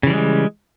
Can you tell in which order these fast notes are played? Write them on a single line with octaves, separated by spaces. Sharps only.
C#3 E3 G3 G#3